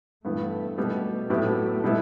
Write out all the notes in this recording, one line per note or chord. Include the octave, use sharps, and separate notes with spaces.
G2 E3 A3 B3
B2 G3 B3
A2 F#3 A3 B3 E4 G4
B2 G3 B3 E4